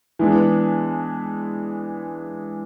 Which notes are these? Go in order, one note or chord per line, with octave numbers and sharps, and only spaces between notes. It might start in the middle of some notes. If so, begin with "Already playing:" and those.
E3 G#3 B3 D4